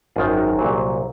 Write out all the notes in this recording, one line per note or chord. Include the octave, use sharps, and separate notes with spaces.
G#1 F#2 D#3 F4 G#4
F#4 A#4
A#4
C2 A#2 F#3 G#4 C5